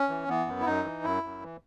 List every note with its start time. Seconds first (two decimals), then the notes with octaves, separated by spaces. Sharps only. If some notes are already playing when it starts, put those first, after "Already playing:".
Already playing: C#4
0.09 E3
0.29 E3 B3
0.46 F#2
0.60 E4
0.66 F#2 D#4
0.84 E3
1.04 F#2 E4
1.23 F#2
1.42 E3